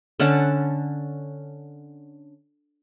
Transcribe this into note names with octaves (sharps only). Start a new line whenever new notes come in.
D3 C#4 F#5 A5